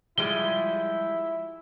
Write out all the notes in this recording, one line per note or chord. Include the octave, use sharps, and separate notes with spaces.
F3 G3 G#3 E4 G7